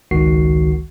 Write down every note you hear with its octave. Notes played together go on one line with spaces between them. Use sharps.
G#1 C#2 D#3 F#4 C7